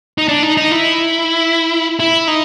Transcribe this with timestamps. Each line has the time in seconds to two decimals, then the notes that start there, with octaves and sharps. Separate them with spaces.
0.18 D#4
0.28 D4
0.43 D#4
0.57 D#4
0.71 E4
2.00 E4
2.28 D#4